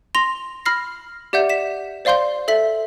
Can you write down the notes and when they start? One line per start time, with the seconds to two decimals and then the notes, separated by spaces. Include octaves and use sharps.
0.15 C6 A#6 F7 G7
0.66 B5 F6 A#6 C7
1.33 G4 D5 E5 F#5 G6
1.49 B6 E7
2.05 C5 D5 F5 C6 G6 G7
2.48 A4 E5 B6 F#7